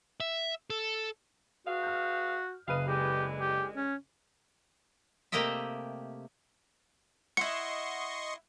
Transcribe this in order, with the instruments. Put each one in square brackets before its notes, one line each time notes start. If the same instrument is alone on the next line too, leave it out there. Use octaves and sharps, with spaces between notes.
[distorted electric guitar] E5
A4
[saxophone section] G#3 B4 F5 [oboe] F#4
[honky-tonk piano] F6 G6
[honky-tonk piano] F#1 B4 D#7 [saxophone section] D#5 F5
[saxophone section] D3 E3 G#3 [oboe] G4
[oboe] G4
C#4
[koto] C3 A3 A#3 G4 D#5 E5
[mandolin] E4 F#5 [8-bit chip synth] D#5 C6 C#6 [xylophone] C#7